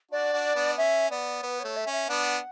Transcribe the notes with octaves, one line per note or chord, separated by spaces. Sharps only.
D4 F#4 D5
D4 F#4
B3 D4
C#4 E5
B3 D5
B3 B4
A3 C#5
E5
C#4
E5
B3 D4 F#5